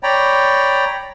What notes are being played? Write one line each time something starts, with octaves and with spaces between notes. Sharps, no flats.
C#5 D5 G5 A#5 B5